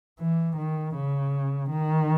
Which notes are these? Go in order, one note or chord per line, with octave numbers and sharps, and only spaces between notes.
E3
D#3
C#3
D#3